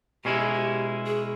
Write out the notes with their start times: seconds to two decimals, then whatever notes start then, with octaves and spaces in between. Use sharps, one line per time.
0.25 B2 G#3 C#4 E4 G4
0.39 G#4
0.53 G4
1.07 G#4